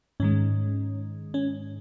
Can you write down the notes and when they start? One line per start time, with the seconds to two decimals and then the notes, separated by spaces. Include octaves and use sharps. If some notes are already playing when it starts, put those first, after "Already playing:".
0.20 G#2 D#3 G#3 C#4
1.34 C#4